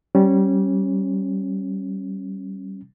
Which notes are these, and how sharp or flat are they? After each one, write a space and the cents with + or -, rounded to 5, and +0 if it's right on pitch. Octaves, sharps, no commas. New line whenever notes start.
G3 -25 C#4 -25